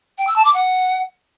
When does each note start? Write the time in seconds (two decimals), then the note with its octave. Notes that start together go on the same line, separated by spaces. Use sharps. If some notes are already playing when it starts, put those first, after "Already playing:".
0.18 G5
0.27 E6
0.36 A5
0.44 D6
0.53 F#5